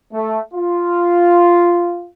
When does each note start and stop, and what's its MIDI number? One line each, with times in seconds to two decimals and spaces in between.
0.13 0.40 57
0.53 2.06 65